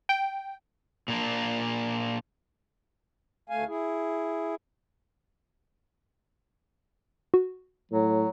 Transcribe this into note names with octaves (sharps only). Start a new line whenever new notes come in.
G5
A#2 A#3 D4
D2 A3 F5 G#5
E4 G#4
F#4
A2 F#3